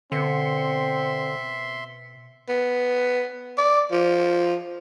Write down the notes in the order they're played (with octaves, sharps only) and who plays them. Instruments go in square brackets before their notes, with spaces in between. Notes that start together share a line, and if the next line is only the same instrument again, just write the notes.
[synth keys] B2 C#7 [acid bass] D3 [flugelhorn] C4 [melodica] E5 C6
[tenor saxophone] B3
D5
F3